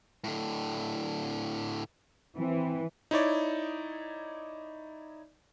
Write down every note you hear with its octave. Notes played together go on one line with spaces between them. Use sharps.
A2 D3
E3 C4
D#4 E4 C#5 D5